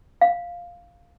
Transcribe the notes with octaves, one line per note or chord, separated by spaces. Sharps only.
F5